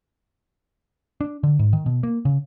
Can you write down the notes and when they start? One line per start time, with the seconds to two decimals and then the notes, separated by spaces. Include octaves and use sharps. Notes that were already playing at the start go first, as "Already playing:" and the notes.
1.21 D4
1.43 D3
1.59 G#2
1.73 D#3
1.86 B2
2.03 A#3
2.25 C#3